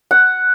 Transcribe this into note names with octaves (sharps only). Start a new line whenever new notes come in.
F#5